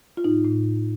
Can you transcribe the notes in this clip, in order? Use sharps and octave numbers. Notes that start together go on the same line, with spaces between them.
F4
A2 D#4
A2